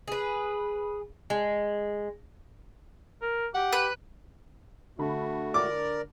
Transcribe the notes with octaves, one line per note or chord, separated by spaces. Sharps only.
G#4 B4
G#3
A#4
G4 F#5
B4
D3 A3 F#4 A5 B5
A#4 D5 D6